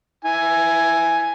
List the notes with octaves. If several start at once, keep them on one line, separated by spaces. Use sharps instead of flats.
E4 G#5